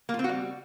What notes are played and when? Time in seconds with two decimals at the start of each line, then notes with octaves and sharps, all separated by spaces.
0.09 A#3
0.14 F4
0.19 C4
0.24 F#4
0.29 G3